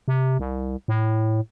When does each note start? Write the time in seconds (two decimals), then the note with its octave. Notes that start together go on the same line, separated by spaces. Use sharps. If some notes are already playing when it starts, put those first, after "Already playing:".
0.08 C3
0.39 C2
0.88 A2